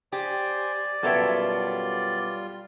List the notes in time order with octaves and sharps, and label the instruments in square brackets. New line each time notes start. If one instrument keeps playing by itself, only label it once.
[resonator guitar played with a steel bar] G4 [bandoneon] C5 G#5 [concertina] D5 [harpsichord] D#6
[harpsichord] F#2 B2 G5 [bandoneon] G3 F4 [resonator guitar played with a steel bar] A4 C#5 E5